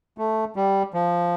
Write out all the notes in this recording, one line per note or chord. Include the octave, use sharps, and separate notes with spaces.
A3
G3
F3